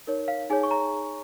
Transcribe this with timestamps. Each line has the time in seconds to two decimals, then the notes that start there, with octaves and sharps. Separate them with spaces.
0.07 D#4 A#4 C#5
0.28 F5
0.50 D#4 G#4 C#5 G#5
0.63 C#6
0.71 A#5